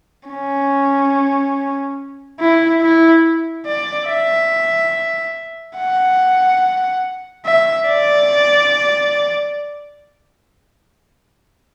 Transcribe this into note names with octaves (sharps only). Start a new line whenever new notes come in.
C#4
E4
E4
D5
E5
F#5
E5
D5